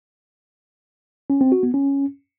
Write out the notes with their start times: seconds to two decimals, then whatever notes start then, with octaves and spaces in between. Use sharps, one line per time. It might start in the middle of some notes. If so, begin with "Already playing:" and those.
1.30 C#4
1.41 C4
1.52 F#4
1.63 B3
1.74 C#4